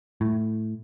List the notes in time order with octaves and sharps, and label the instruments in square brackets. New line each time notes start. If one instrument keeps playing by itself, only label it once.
[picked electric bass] A2